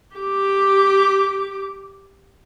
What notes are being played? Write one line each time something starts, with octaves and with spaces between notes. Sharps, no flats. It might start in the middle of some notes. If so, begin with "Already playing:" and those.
G4 D6